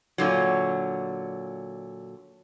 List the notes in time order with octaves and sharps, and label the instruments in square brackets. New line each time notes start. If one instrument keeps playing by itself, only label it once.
[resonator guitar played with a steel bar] A#2 D3 F#3